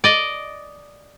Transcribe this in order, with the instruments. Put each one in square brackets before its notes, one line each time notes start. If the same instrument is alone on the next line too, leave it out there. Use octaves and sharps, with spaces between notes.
[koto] D5 D#5